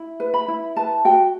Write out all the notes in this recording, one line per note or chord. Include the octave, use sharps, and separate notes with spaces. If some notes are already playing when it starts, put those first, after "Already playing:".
Already playing: E4
B4
B5
E4
B4 A5
F#4 G5